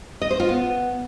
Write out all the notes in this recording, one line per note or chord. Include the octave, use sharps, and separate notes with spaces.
D#5
C5
F4
B3